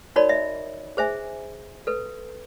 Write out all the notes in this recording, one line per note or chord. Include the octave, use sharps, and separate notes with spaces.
D#4 F#4 A#4 C#5 D5 B5
D#5 E5
G#4 C5 E5 G#5
A4 B4